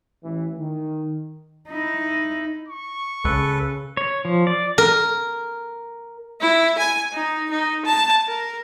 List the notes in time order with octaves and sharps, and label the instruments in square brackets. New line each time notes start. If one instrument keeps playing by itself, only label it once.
[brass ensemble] A1 E3
D#3
[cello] D#4 E4
[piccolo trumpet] C#6
[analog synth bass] C#2 [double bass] C#3 [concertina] A4 B4
[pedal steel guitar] C#5
F3
D5
[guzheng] A#4
[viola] E4
G#5
D#4
D#4
A5
A#4